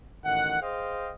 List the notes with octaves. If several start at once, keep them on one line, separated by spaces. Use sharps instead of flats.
A1 D#3 F#5
G#4 C5 D#5 F5 G5